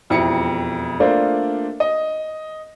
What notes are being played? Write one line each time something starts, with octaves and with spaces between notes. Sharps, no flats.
E1 F2 E4 G4 C#7
A3 A#3 D4 F4 C5 D5
D#5